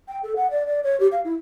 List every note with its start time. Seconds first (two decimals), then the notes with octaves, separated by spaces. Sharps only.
0.08 G5
0.23 A4
0.36 F#5
0.51 D5
0.67 D5
0.84 C#5
1.00 G4
1.12 F5
1.25 E4